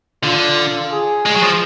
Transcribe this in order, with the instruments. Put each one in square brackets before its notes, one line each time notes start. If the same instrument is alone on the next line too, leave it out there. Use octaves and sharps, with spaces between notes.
[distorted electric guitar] D3 [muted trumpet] F4
[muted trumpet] G#4
[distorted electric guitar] G#3
F#3
F3